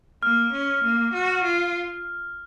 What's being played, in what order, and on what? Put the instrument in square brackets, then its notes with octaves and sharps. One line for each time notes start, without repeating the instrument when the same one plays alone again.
[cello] A#3 [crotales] F6
[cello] C#4
A#3
F#4
F4